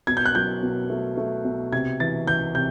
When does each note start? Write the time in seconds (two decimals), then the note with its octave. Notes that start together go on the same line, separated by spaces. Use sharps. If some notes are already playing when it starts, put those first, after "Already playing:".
0.07 B2 G#6
0.17 G6
0.26 F#6
0.35 F#3 G6
0.63 B2
0.90 A3
1.18 A3
1.45 B2
1.72 C3 G#6
2.00 E3 A6
2.27 E3 G6
2.55 C3 G6